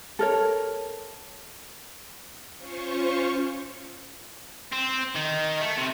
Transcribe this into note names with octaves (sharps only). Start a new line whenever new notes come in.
A4 A#4 C#5
C#4 F4 C5 C#6
C4
D#3
A3
C3